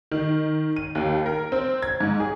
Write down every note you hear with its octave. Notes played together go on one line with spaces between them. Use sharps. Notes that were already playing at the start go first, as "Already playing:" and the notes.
D#3
D#7
D#2
A#4
C4
G#6
G#2
G#4